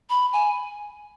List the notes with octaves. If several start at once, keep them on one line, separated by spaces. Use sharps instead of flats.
B5
G#5